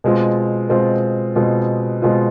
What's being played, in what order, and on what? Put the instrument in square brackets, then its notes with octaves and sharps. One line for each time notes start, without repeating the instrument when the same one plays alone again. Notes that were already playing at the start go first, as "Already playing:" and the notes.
[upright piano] B2 G#3 C4 F4
B2 G#3 C4 F4
B2 G#3 C4 F4
B2 G#3 C4 F4